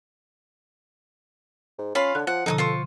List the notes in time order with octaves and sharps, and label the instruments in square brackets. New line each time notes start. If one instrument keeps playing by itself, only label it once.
[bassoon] G#2
[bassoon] C#4 [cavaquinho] F4 F5 B5 [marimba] C#5
[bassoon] D3 [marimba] A5 F#6
[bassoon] F3 [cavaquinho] F#5
[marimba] B2 D3 F3 [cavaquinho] D#4 G5 D#6 [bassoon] A4
[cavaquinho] F4 C5 C#6